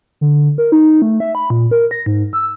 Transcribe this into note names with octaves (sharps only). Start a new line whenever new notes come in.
D3
A#4
D#4
A3
E5
B5
A#2
A#4
A#6
G#2
E6